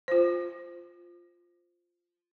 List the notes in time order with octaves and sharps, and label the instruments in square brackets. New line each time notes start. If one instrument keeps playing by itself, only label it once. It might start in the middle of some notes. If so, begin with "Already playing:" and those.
[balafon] F4 C5